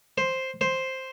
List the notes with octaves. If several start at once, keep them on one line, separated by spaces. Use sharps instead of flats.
C5
C5